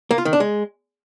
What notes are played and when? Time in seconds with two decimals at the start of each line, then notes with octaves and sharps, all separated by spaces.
0.11 A#3
0.18 F4
0.25 D#3
0.33 D4
0.40 G#3